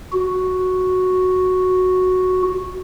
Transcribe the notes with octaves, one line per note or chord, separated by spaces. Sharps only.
F#4